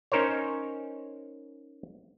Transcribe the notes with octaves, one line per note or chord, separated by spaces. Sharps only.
C#4 D#4 A#4 C5 C#5